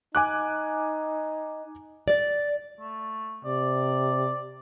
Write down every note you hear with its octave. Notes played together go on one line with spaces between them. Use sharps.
D#4 G#5 D6 F#6
D5
A3
C3 D5